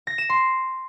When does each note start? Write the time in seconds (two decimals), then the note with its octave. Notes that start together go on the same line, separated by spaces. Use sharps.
0.07 A#6
0.18 E7
0.29 C6